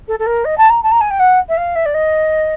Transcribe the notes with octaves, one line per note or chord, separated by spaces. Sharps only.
A4
A4
A#4
D#5
A5
A#5
A5
A#5
G#5
G5
F#5
E5
F5
E5
D5
D#5